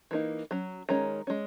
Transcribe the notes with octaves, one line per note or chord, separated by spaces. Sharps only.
E3 A#3 D#4
F#3 C#4
D#3 G#3 C#4 A#5
G#3 C#4